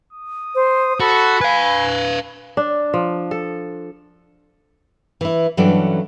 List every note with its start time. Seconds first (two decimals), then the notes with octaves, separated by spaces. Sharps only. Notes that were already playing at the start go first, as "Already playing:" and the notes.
0.13 D#6
0.55 C5
1.00 F#4 A4 B5
1.41 B4 F5 G#5
2.57 D4
2.94 F3
3.31 A4
5.21 E3 E4
5.57 G2 E3 F#3 C#4 A4 D5